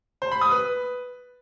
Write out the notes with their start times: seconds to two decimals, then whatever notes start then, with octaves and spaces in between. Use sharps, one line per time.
0.22 C5
0.32 B5
0.41 D#6
0.51 B4